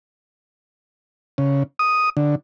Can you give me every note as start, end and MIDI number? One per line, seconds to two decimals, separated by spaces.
1.38 1.63 49
1.79 2.10 87
2.17 2.35 50